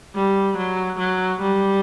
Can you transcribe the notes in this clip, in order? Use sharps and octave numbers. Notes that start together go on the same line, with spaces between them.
G3
F#3
F#3
G3